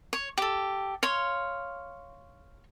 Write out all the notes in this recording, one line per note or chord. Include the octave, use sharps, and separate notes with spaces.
C#5
G4 A4
C#5 F5 C6